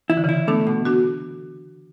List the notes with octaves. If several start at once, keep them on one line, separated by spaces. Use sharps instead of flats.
E3 E4
D3
C#3 E3 E4
A3 B3 D4
B2
D4 F#4